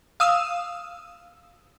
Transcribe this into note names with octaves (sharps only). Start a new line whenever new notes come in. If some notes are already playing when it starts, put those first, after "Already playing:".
F5 D#6 E6